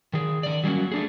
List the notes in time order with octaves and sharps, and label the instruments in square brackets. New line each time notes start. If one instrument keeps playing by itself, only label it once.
[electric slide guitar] D#3 G#4
D#3 D5
F#3 G3 A#3 C#4 F4 F#4
A3 D4 G#4